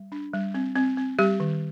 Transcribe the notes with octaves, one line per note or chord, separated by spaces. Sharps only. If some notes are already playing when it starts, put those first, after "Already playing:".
Already playing: G3
D4
G3
C4
C4
C4
G3 G4
D#3